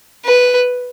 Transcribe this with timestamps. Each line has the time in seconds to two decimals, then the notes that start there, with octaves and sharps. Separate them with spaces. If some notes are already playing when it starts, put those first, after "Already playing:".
0.25 B4